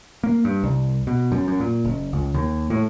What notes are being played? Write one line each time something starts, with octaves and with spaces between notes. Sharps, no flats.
A#3
G2
C2
B2
F#2
F#2
A#2
F#1
C#2
D#2
A2